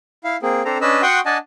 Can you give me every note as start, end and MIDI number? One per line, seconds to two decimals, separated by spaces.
0.24 0.37 64
0.24 0.37 77
0.43 0.62 58
0.43 0.62 60
0.43 0.62 68
0.65 0.78 60
0.65 0.78 62
0.65 0.78 69
0.65 0.78 72
0.65 0.78 82
0.81 1.02 61
0.81 1.02 62
0.81 1.02 71
0.81 1.02 75
0.81 1.02 88
1.02 1.20 66
1.02 1.20 78
1.02 1.20 79
1.02 1.20 84
1.02 1.20 85
1.02 1.20 87
1.26 1.38 62
1.26 1.38 75
1.26 1.38 78
1.26 1.38 80
1.26 1.38 81